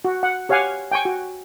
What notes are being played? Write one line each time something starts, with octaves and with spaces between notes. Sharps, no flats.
F#4
F#5
G4 C#5 F5 F#5 G#5
G5 G#5 C#6
F#4